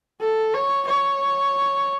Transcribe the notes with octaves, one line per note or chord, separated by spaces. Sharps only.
A4
C#5
C#5